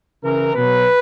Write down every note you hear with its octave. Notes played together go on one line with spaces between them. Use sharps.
C#3 E3 A#4
B2 F#3 B4